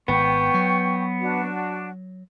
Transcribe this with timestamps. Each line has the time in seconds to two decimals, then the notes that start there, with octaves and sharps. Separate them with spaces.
0.08 G#1 B3 G5 C#6
0.54 F#3
1.21 D4 F#4